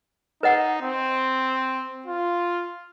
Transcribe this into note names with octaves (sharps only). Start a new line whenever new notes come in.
D#4 B4 D#5 F#5
C4
F4